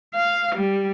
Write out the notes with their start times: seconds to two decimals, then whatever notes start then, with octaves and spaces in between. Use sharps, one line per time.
0.15 F5
0.56 G3